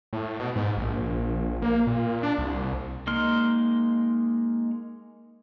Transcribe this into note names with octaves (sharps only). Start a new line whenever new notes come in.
A2
B2
G#2
A#1
A#3
A#2
D4
C2
G#3 A#3 D#4 C6 F6